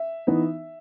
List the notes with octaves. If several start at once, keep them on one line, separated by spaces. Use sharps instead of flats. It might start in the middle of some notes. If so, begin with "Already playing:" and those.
Already playing: E5
E3 B3 D#4